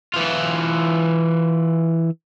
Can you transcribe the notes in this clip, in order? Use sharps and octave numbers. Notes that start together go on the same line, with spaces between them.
E3 F4